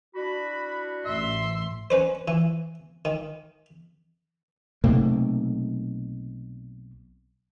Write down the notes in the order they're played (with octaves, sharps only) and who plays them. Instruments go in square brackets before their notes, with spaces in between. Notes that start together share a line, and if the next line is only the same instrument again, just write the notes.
[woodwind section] D4 E4 F#4 [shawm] B5
[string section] A1 C6 [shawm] E5
[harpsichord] C#4 B4 C5
E3
D#3
[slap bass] B1 C3 A3 A#3